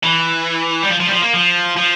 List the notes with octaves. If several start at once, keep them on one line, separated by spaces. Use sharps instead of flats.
E3
G3
F3
F3
G3
F3
A#3
F3
F3